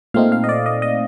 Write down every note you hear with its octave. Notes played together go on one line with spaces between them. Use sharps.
A#2 A3 C4 D#4 F5
F5
D#5
D5
D#5
D#5